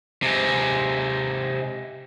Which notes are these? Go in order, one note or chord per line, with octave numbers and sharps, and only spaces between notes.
C3 G#3